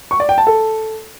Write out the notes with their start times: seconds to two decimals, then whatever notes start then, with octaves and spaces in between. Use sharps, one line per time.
0.11 C#6
0.20 D5
0.29 G5
0.38 A5
0.47 A4